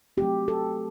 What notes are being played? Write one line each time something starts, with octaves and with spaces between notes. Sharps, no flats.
F#3 A3 C4 G4
A4